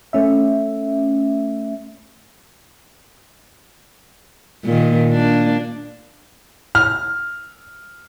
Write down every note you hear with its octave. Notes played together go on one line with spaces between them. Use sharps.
A3 C#4 E5
A#2 D#3
A#3 D4
F6